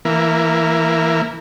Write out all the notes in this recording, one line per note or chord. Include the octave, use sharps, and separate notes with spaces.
E3 A#3